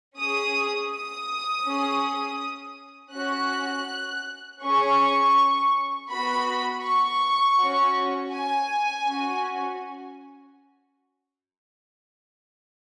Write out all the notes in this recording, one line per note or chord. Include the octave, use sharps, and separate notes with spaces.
C#4 G#4 D#6
D#6
C#4 G#4
C#4 F#4 F#6
C#4 G#4 C#6
B3 F#4 B5
C#6
C#4 F#4
G#5
C#4 F#4